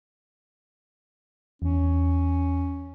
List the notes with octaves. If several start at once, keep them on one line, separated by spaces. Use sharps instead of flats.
E2 C#4